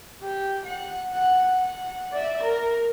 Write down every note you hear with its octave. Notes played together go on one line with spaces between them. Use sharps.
G4
F#5
F#5
F#5
D5 E5
A#4